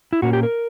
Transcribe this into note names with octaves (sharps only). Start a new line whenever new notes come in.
E4
A#2 A#3 C#4 F#4
G4
A#4